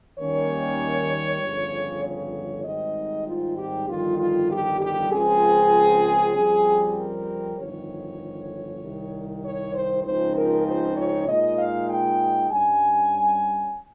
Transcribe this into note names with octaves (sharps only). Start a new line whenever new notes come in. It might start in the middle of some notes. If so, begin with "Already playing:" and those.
D#2 D#3 G3 A#3 C#4 C#5
G1 F2 C#3
C#5
G#1 G#2 G3 C4 D#4 D#5
F4
G4
G1 F2 D#3 G3 F4
F4
G4
G4
C#2 C#3 F3 C4 G#4
F2 C#3 G3 C4
A#4
G1 F2 D#3 C#5
C2 C3 D#3
C#5
C5
C#2 C#3 F3 C4 D#4 C5
A#4
C5
C#5
A#2 G#3 D#4 D#5
F5
G5
G2 G3 C#4 G#5